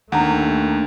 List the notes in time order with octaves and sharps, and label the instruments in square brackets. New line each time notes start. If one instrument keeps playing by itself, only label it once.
[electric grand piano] D#2 [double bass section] A3 [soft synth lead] D4 [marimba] F#5 A#5